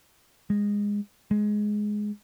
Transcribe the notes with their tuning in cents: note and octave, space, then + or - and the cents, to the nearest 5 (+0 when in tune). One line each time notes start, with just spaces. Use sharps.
G#3 -20
G#3 +5